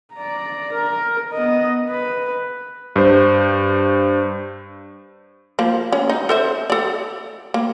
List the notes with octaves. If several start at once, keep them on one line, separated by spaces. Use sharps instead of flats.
D5 A#5
A#4
B3 D#5
B4
G2 C5
F3 A#3
C#4
D#4
A4 C5 E5
A4 D5
A#3